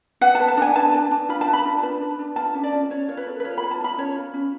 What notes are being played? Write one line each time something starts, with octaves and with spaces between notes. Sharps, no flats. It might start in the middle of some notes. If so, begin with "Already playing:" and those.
B4 F#5
A5
B4
A5
D4 G#5
B4 A5
D4
D4
F4 B5
A5
B4
B5
D4
B4 A5
D4
D4
F4 A5
C#4
D5
C#4
C#4 C#5
F4 C#5
B4
A4
B4
F4 C#5
B5
F4
A5
F4 B5
C#4 C#5
F4
C#4